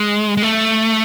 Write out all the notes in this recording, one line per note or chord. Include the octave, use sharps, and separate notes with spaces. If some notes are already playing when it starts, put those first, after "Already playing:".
Already playing: G#3
G#3
A3